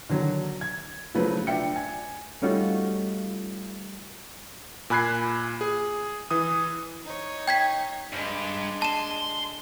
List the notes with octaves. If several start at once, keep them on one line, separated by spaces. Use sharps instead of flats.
D3 D#3 F#3
G#6
C#3 F3 F#3 A3 B4
D4 E5 G5 C#7
G#5
G3 A3 C#4 D#4 F4 F#4
A#2 G#5 B5 F#6 G#6 C7
G#4
E3 D#6
D#4 C#5
G5 G#6 B6
G2 G#3 D4
A5 C6 E7